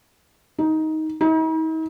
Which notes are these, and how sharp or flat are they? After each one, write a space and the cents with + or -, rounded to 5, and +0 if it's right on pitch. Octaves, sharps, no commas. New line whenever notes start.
D#4 +15
D#4 +45